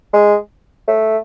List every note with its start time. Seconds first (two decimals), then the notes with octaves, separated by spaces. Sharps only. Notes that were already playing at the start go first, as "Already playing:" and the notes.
0.13 G#3
0.88 A3